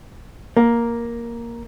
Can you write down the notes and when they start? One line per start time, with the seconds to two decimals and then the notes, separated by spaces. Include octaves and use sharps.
0.57 A#3